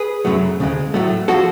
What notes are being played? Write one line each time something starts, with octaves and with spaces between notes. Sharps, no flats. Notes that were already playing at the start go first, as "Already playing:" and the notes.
Already playing: G#4 B4
F#2 C#3 F#3 A3
D2 C#3 G#3
A2 F#3 A3
F3 G#3 F#4 A4